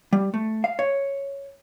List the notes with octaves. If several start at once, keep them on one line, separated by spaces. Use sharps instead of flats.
G3
A3
F5
C#5